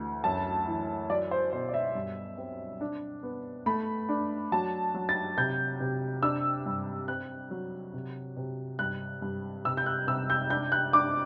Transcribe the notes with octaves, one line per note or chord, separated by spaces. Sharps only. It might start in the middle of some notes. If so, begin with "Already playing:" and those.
Already playing: D2 E3
F#2 A5
E3
F#3 D5
C5
B2 C5
D5
E5
G2
C4
D4
B3
A3 B5
D4
F#3 A5
F#3
A6
C3 G6
C3
D4 E6
G2
C4 F#6
F#3
C3
C3
G2 F#6
G2
C3 E6
G6
F#6
C3 E6
G6
D4 G6
F#6
D4 D6